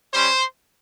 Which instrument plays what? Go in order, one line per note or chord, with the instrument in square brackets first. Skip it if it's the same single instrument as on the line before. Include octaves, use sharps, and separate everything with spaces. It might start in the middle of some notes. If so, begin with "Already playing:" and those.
[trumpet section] G3 C#4 G4 C5